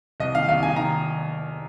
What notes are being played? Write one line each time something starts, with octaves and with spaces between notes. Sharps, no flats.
C2 D#5
D#3 F5
C2 F5
D#3 G#5
D#3 A#5